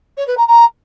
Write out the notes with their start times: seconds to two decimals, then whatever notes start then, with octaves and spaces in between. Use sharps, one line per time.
0.17 C#5
0.27 B4
0.37 A#5
0.47 A#5